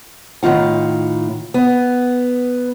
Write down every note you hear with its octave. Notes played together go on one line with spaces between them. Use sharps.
A2 D#3 A#3 F4 F#5
B3